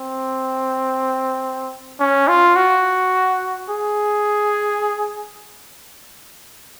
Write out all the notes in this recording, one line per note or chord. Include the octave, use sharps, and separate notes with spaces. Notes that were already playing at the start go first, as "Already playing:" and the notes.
Already playing: C4
C#4
F4
F#4
G#4